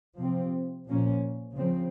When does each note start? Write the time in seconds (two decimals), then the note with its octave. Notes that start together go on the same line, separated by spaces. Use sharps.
0.19 C3 F3 C4
0.87 A#2 F3 A#3 C#4
1.54 C#3 F3 C4